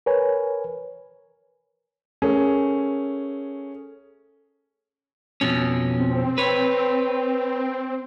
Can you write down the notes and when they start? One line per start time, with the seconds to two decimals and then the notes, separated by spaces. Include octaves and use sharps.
0.06 A#4 B4 C#5 G#5
2.22 A3 C#4 G#4 A#4
5.41 F2 B2 C#4
6.00 C4
6.38 B4 C#5